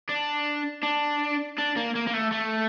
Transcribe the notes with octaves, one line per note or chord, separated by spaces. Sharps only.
D4
D4
D4
A#3
A#3
A#3
A3
A3